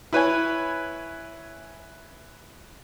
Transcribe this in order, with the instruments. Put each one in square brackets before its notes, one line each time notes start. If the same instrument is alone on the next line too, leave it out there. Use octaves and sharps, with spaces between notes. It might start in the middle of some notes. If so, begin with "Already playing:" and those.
[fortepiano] E4 B4 C#5 G#5